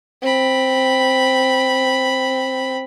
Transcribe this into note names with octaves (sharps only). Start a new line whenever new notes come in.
C4 B5